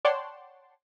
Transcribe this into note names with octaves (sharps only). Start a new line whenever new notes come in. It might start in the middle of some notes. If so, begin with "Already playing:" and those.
C#5 D5 F#5 G5 A5 C6